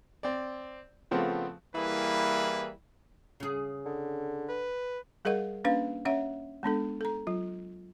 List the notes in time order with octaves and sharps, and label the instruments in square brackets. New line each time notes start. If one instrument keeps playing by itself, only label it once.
[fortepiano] C4 D5
C#3 F3 A3 B3 C4
[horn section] E3 G3 A#3 E4 G#4 B4
[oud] C#3 G#4
[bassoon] D3
[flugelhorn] B4
[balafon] G3 G#4 A#4 D#5 F#5
A#3 C#4 D4 B4 F5
C#4 C#5 E5 F#5
G#3 B3 D4 A4
A4 A#5
F#3 F4